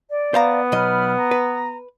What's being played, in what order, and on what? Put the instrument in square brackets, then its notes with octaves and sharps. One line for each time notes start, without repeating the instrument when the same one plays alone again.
[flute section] D5
[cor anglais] B3 [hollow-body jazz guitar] C5 F5 A#5
[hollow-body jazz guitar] B1 F#3 D#5 [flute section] B5 F6
[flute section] A#5
[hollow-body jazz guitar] B4